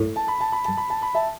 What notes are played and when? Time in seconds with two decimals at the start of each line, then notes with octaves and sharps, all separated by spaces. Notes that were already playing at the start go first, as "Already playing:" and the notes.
Already playing: A2
0.16 A5
0.28 B5
0.40 A5
0.52 B5
0.65 A5
0.77 B5
0.90 A5
1.02 B5
1.14 E5 A5